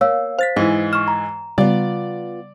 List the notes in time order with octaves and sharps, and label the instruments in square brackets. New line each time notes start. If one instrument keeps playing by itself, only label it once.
[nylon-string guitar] A#3 [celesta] C#5 F5 E6
[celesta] C5 [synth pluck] F5 A6 B6
[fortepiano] G#2 E3 [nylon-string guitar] D#5
[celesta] C#6 F6 [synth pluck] E7
[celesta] A#5
[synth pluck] C#3 G3 [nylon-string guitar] B3 F4 [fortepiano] D5